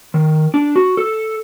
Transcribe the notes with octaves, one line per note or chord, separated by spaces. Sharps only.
D#3
D4
F#4
A4